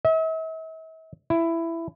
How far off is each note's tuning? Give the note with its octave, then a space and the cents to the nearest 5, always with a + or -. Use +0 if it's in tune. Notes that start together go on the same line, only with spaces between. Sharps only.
E5 -45
E4 +10